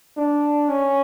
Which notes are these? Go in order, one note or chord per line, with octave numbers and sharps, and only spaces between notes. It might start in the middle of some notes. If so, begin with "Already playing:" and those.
D4
C#4